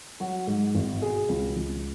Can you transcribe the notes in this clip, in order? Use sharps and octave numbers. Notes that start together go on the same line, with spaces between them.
F#3 F#4
G#2
G#1
B2 G#4
C#2
C#2